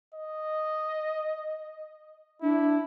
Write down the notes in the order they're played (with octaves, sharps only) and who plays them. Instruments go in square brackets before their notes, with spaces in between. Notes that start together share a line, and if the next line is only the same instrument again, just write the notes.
[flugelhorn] D#5
[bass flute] D4 [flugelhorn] E4